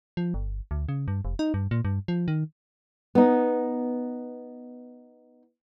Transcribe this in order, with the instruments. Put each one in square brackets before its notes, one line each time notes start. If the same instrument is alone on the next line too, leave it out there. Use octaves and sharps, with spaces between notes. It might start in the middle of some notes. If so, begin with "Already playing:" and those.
[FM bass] F3
G1
D2
C#3
G2
F1
D#4
G2
A#2
G2
F3
D#3
[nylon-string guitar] B3 D#4